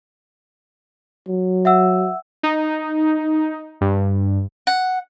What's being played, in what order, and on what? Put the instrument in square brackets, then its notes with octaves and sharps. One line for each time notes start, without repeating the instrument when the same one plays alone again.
[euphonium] F#3
[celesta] E5 F#5 E6
[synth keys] D#4
G2
[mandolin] F#5